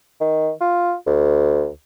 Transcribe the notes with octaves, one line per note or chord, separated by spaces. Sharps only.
D#3
F4
D2